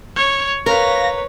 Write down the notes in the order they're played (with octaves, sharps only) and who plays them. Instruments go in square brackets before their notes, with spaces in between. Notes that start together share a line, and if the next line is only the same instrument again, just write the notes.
[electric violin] C#5
[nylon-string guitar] A#4 [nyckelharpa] B4 C#5 [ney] F5 [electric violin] A#6